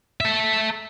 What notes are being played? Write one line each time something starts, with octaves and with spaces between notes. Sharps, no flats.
A4 E5